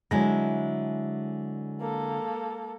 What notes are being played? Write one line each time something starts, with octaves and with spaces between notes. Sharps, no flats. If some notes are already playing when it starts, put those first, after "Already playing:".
D3 F#3 G#3 E4 G#5 A#6
A#3 A4